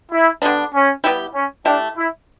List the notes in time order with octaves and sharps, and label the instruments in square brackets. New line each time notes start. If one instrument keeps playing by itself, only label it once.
[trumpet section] E4
[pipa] D3 G3 B3 D4
[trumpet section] C#4
[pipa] G3 B3 E4 G4
[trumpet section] C#4
[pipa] A3 E4 G4 [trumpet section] D4
[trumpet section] E4